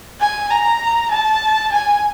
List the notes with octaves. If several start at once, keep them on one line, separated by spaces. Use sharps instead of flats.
G#5
A#5
A5
G#5